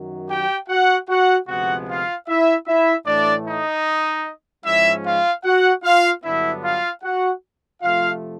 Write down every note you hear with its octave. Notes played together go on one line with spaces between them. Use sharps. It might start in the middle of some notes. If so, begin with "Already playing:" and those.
Already playing: F#2 D#3 F#3
G4 G5
F#4 F#5
F#4 F#5
D2 C3 F3 G#3 B3 F#4 F#5
F4 F5
E4 E5
E4 E5
A2 E3 A3 D4 D5
D#4 D#5
G#2 F3 G#3 C#4 E4 E5
F4 F5
F#4 F#5
F4 F5
G2 D3 F#3 B3 D4 E4 E5
F4 F5
F#4 F#5
C3 F3 A3 F4 F5